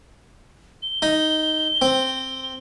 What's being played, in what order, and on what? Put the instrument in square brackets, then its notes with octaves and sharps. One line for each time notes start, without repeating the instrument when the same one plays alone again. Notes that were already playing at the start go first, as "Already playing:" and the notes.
[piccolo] G7
[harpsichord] D#4
C4